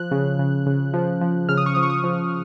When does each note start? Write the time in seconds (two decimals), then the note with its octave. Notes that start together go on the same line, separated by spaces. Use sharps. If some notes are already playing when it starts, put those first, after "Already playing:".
Already playing: F3 F#6
0.11 C#3
0.39 C#3
0.66 C#3
0.94 F3
1.21 F3
1.49 C#3 F6
1.57 D#6
1.66 C#6
1.75 F3 D#6
1.83 C#6
1.90 D#6
2.04 F3